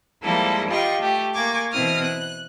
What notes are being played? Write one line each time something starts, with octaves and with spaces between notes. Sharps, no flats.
F3 G3 G#3 A#3 E4 A4
F4 G4 D#5 G5 C#6
A3 G4
A#3 G#5 C#6 D6
B2 E3 C4 E4 D#6 F6
F#6